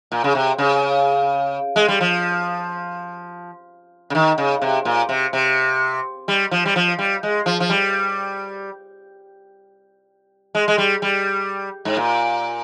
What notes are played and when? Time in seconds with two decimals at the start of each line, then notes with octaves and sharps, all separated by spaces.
0.12 A#2
0.24 C#3
0.35 C3
0.58 C#3
1.76 G#3
1.88 G3
2.01 F3
4.10 C#3
4.15 D#3
4.38 C#3
4.62 C3
4.85 A#2
5.09 C3
5.33 C3
6.28 G3
6.51 F3
6.65 G3
6.76 F3
6.99 G3
7.23 G#3
7.46 F3
7.60 F3
7.70 G3
10.55 G#3
10.68 G#3
10.78 G3
11.02 G3
11.85 G#2
11.97 A#2